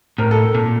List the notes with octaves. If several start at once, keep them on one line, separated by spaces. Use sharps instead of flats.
A2 A#4
A4
A#2